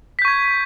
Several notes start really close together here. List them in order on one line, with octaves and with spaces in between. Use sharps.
B6 G6 C#6 G#6